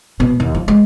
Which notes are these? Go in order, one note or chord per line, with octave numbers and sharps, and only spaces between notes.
B2
D#2
F3
G#3